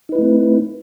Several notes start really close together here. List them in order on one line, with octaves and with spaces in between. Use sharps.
D#4 B4 E4 A3 C4